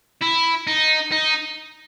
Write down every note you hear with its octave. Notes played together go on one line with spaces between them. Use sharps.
E4
D#4
D#4